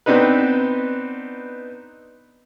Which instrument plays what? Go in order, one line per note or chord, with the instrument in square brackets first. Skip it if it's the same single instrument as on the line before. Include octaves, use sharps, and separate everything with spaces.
[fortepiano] B3 C4 D4 D#4 B4